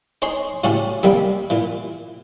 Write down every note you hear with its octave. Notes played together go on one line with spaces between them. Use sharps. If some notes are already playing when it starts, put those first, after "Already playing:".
D#4 G#4 C#5 C6
A2 C#3 A3 C#4 F#4 G4
D#2 C3 D#3 G3 A#3
A#2 E3